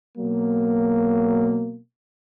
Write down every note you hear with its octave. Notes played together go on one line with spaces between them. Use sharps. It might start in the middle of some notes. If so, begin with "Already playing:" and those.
B2 F#3 A#3